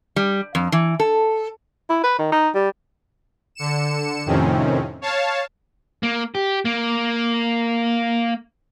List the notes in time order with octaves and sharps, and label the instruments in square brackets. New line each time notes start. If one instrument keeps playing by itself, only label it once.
[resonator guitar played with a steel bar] G3
F2
E3
A4
[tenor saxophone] E4
B4
D#3
D#4
G3
[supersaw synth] D3 C#7 E7
F2 A2 C3 D#3 C4 C#4
C#5 F5 A5
[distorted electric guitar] A#3
G4
A#3